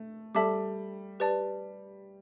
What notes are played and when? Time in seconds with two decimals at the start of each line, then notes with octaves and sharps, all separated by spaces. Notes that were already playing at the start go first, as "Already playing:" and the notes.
Already playing: A3
0.35 G3 A4 E5 A5 D6
1.20 G4 B4 D5 A5